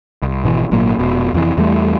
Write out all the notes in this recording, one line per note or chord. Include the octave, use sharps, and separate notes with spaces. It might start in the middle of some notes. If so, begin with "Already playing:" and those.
C2
G#1 B2 D3 E3
G#1 A#2 F#3 A#3
F1 B2
F1 F2 A2 E3
E2 E3 G3 A3